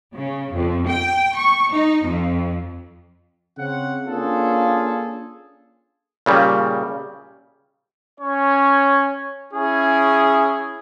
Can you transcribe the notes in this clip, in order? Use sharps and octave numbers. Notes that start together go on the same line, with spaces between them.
C#3
F2
G5
C#6
D#4
F2
C#3 C4 F#5
A#3 C#4 D4 F4 G#4 A4
A#2 C#3 G3
C#4 C#5
C#4 E4 G#4